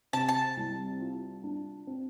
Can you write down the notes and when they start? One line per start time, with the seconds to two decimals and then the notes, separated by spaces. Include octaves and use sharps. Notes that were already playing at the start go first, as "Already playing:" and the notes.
0.13 C3 A5
0.29 A5
0.57 C2
1.00 F4
1.44 D4
1.87 C4